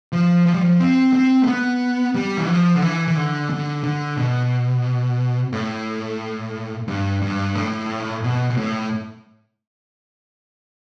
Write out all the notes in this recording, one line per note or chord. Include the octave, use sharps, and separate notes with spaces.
F3
F3
G3
F3
C4
C4
A3
B3
G3
E3
F3
D3
E3
E3
D3
D3
D3
B2
A2
G2
G2
A2
B2
B2
A2